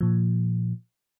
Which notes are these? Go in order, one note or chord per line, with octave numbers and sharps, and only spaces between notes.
A#2 F3